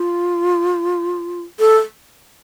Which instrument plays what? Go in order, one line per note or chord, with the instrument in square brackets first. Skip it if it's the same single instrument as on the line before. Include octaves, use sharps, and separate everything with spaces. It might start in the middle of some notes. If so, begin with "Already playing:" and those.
Already playing: [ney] F4
A4